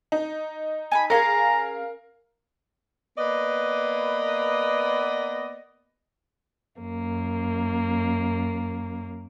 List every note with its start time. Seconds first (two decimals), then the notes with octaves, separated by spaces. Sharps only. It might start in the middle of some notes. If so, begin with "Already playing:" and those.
0.12 D#4
0.91 G#5 A5 B5
1.10 C#4 F#4 G#4 A#4 F5 A#5
3.18 A#3 B3 B4 D5 D#5
6.79 F#2 A#3